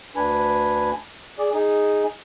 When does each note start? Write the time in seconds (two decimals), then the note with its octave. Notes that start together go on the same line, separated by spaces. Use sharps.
0.16 D2 D4 B4 G#5
1.39 G#4 D5
1.54 D#4 G#4